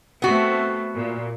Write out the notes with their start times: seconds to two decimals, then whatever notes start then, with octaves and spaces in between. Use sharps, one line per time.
0.22 A3 B3 C4 F#4
0.96 A#2